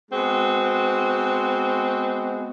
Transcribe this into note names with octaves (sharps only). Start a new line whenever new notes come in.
G#3 B3 C4 F#4